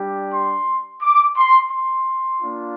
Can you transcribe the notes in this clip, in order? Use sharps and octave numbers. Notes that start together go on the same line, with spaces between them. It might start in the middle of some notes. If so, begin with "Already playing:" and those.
Already playing: G3 D4 G4
C6
D6
C6
C6
A#3 D4 F4